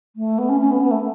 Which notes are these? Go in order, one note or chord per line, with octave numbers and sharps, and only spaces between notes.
A3
B3
C#4
C#4
B3
B3
A3